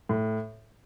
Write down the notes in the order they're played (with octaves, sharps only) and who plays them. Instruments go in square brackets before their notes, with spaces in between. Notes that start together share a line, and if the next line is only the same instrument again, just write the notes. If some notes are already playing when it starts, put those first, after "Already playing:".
[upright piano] A2